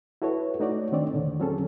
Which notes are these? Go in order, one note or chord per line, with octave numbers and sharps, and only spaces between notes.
E4 F#4 A4 B4 C#5
A3 D#4 F#4 C#5 D5
D#3 A3 C4 D4 C#5 D5
E2 A#2 D3 D#3
F#3 C4 C#4 G#4 A4